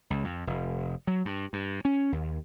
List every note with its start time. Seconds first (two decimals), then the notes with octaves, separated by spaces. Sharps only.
0.10 C#2
0.24 F2
0.47 F1
1.07 F#3
1.25 G2
1.53 G2
1.85 C#4
2.12 D#2